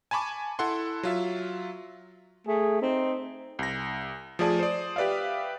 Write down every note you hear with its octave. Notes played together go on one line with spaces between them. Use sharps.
G#5 A5 B5 C#6 D6
E4 A4 F#5 C6
F#3 F4 E5
A3 G#4
C4 D#4
C2 A#6
F3 A3 G#4 D5 A5 D#6
C5 D5
G4 B4 D5 E5 F5